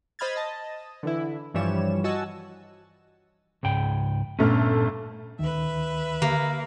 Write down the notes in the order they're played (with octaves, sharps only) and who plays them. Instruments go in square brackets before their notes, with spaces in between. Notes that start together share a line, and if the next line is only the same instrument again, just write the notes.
[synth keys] C5 D#5 B5 F6 G#6 A6
D#5 A5
D3 E3 E4
G2 E3 F3 G3 C#5 E7
F#4 D#5 G#5 A5 E6
[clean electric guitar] C#2 G#2 G5
[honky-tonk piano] G1 A3 F6 [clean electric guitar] A#2 C#4
[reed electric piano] D2 D#3 [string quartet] B4 E5
[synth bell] D3 [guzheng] A#3